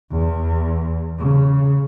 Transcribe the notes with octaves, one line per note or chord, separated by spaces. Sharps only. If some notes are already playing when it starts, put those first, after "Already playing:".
E2
C#3